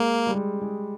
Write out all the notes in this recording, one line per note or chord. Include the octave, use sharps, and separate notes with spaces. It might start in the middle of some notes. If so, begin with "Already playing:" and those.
Already playing: G#3 A#3
G3
G#3
G#3